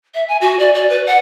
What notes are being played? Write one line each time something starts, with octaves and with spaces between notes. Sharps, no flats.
E5
G#5
F#4
D5
D5
B4
F#5